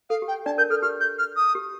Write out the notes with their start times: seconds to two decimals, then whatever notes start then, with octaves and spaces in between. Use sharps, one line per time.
0.10 A4 F5
0.22 G4
0.28 G5
0.46 D4 D5 A5
0.58 A#4 G6
0.70 A4 F6
0.82 G4 F6
1.00 G6
1.18 F6
1.36 D#6
1.55 G4